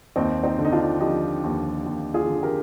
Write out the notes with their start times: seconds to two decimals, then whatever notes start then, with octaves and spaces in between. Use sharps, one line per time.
0.16 D#2 C4 D#4
0.44 C4 D#4
0.59 D3
0.64 D#4
0.72 D4 F4
1.00 F3 D#4 G4
1.44 D#2
1.86 D#2
2.14 F4 G#4
2.28 D3
2.43 G4 A#4